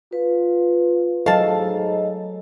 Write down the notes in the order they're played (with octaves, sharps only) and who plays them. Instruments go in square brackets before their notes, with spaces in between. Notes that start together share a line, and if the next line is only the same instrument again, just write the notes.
[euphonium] F4 [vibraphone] B4
[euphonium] G#2 [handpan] F#3 A4 [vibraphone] D#5 [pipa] F5 A5